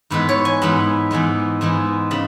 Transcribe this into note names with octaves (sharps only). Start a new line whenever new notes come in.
G#2 E3 G#3 B3 B4
C#5
G#5
G#2 E3 G#3 B3 B5
G#2 E3 G#3 B3
G#2 E3 G#3 B3
C#3 B5